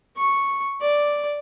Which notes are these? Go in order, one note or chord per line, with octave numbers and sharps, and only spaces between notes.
C#6
D5